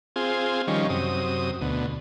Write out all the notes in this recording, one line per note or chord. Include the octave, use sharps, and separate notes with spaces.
C4 F4 G#4
D#3 F3 G3 C#4
F#2 C3 D#6
D2 B2